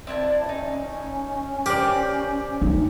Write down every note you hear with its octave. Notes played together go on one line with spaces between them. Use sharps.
C4 E4 D5 A5
C#4 D#4
G4 A#4 C5 D5
D#4